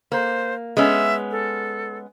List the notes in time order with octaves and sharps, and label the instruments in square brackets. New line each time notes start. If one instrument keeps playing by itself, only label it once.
[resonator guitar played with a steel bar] A#3 [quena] C5
[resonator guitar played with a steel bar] G#3 B3 C#4 [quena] E5
[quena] A4